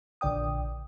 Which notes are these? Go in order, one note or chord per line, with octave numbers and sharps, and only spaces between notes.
A#1 D3 D5 G5 D#6